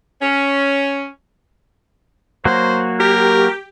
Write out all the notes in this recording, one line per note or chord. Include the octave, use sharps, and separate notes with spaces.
C#4
F#3 A#3 F#4 C5
G4 A#4